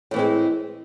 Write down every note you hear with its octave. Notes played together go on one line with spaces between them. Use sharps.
A2 E3 G#3 C4